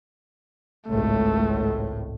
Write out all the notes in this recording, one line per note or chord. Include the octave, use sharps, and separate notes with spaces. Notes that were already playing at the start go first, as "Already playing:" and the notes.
G#1 C#2 A2 A3